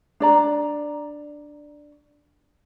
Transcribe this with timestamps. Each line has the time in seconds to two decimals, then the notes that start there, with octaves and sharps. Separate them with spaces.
0.20 D4 D5 A#5